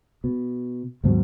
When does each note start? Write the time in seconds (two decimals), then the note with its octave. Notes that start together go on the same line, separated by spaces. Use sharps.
0.24 B2
1.04 D#2 G#2 B2 F#3